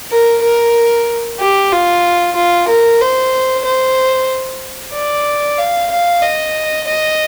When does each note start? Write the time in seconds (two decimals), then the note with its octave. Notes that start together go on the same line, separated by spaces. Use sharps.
0.11 A#4
0.42 A#4
1.39 G4
1.72 F4
2.36 F4
2.68 A#4
3.00 C5
3.65 C5
4.93 D5
5.58 F5
5.91 F5
6.22 D#5
6.87 D#5